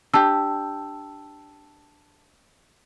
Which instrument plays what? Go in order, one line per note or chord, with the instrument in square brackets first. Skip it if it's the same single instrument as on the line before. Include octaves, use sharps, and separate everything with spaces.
[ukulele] D4 G4 [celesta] A5 E6